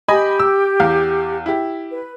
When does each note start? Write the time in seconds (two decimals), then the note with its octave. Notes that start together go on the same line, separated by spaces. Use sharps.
0.08 G4 D#5 G#5 B5
0.40 E6
0.80 E2 F5
1.46 E4 G4
1.91 B4